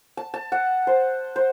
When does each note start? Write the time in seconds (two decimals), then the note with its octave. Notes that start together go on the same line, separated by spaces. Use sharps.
0.17 A5
0.34 A5
0.52 F#5
0.87 C5
1.36 C5